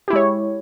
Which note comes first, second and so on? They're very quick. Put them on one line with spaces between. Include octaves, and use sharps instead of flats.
G4 E4 G#3 C#5